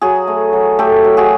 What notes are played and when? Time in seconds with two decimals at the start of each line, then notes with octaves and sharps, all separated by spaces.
0.01 F#3 F#4 G#4
0.27 A3
0.53 F#3
0.79 A3 G4 A4
1.04 F#3
1.17 F#4 G#4